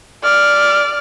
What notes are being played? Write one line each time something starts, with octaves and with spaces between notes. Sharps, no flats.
D5 F6